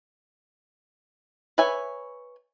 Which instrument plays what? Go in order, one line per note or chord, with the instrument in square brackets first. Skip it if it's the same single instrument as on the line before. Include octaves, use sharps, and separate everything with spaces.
[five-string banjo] B4 C#5 E5 G#5